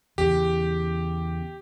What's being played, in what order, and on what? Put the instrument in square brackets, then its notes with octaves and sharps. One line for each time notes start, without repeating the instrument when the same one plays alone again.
[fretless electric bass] E2 C#3 [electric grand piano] G4